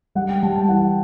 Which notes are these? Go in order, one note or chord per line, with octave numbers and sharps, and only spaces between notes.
G3 F#5
G5
G3 A5
A5
E3 F#5